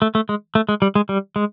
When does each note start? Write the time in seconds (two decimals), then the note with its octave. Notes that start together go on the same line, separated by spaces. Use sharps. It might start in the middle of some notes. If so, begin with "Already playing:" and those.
0.02 A3
0.15 A3
0.29 G#3
0.55 A3
0.69 G#3
0.82 G3
0.95 G#3
1.09 G3
1.36 G#3